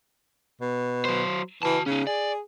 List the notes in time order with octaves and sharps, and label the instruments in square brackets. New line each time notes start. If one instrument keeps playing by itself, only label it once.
[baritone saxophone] B2
[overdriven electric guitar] F#3 C5
[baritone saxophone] E3 [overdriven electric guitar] F#4 A5
[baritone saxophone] C#3 [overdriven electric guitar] C#4 D#4
[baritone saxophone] G#4 [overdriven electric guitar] D5